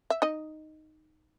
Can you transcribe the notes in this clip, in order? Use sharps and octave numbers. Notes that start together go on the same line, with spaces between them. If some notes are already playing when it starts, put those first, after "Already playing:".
E5
D#4 D#5